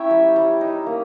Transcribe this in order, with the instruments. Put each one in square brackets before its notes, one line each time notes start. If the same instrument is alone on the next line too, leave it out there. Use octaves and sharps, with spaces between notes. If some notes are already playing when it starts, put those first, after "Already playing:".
Already playing: [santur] C#4 E4 C#5 E5 G5 A#5
G3
G3
D#4
A#3